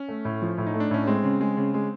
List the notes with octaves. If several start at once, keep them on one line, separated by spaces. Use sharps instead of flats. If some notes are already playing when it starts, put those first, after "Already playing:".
Already playing: C#4
A3
A2
F3
A2
D#4
A3
D4
A2 C#4
G#3 C4
C#3
G#3
C#3
G#3